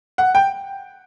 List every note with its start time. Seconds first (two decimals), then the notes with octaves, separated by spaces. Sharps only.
0.18 F#5
0.35 G5